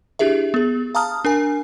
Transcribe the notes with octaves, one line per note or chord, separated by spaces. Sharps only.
D4 E4 G4 G#4 E5
B3 G#4
F5 A5 A#5 D#6 F6
D4 A#4 G#5